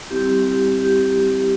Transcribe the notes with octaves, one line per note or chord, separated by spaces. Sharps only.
G3 C4 E4 G4
G4
G4